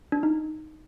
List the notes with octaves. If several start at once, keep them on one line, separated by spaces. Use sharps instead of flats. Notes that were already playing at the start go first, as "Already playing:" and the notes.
D4
D#4